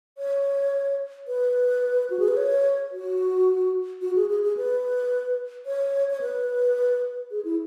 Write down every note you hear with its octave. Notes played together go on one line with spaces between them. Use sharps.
C#5
B4
F#4
G#4
B4
C#5
F#4
F#4
G#4
G#4
G#4
B4
C#5
C#5
B4
G#4
E4